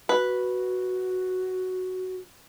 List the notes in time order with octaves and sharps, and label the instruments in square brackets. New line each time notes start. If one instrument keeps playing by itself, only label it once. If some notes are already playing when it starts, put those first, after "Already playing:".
[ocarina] F#4 [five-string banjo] B4